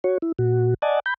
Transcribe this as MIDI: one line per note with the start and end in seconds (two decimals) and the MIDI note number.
0.04 0.18 66
0.04 0.18 73
0.22 0.32 64
0.39 0.74 46
0.39 0.74 66
0.82 1.00 74
0.82 1.00 75
0.82 1.00 78
0.82 1.00 80
0.82 1.00 81
1.06 1.14 83
1.06 1.14 91